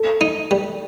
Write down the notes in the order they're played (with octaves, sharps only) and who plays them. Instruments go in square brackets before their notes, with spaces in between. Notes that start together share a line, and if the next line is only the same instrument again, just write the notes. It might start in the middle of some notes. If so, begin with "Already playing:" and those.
Already playing: [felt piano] A4
[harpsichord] D#4
G3